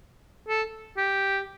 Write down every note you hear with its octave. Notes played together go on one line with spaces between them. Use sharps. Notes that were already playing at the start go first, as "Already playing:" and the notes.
A4
G4